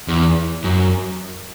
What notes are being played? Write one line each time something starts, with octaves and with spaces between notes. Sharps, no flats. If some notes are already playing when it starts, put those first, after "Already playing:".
E2
F#2